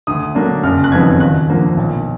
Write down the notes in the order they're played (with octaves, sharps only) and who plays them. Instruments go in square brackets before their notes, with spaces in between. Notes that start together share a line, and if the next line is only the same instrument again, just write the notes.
[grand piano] D2 D#6
D3 F#3 A#3 D4
F#1 F6
F#6
F2 D#3 F#3 B3 G#6
D#2 F#6
D3 F3 A#3
B1